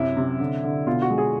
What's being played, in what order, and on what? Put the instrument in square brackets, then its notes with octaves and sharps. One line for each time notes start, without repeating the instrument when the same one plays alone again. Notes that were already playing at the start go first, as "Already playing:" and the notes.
Already playing: [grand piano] F#2 C3 E4
C3
D3
D3
B2 F4
F#4
G#3
G#4